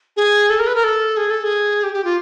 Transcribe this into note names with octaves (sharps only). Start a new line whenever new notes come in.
G#4
A4
A#4
B4
A#4
A4
G#4
A4
G#4
G4
G4
F4